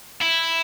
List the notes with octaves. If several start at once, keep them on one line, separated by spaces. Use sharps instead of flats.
E4